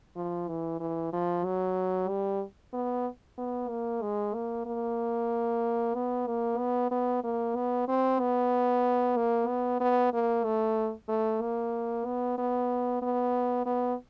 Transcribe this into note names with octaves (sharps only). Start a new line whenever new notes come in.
F3
E3
E3
F3
F#3
G3
B3
B3
A#3
G#3
A#3
A#3
B3
A#3
B3
B3
A#3
B3
C4
B3
A#3
B3
B3
A#3
A3
A3
A#3
B3
B3
B3
B3